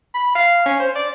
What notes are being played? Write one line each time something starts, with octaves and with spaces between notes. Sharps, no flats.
B5
F5
C#4
C5
D5